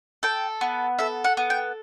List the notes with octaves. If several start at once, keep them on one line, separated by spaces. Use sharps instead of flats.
A4 G5
B3
A4 E5
F#5
B3
G5